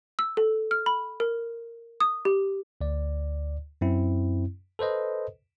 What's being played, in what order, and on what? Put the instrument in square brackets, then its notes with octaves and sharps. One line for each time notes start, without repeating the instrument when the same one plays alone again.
[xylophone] E6
A4
F6
B5
A#4
D#6
G4
[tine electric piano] D2 D5
F#2 C4 E4
A4 B4 C5 D#5